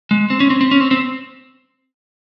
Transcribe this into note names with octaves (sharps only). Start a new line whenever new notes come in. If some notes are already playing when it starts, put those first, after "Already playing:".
G#3
C4
C#4
C4
C4
C#4
C4
C4